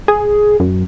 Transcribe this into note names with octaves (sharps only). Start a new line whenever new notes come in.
G#4
F#2